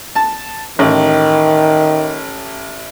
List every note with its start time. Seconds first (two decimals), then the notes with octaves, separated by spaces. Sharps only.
0.16 A5
0.79 A1 D#3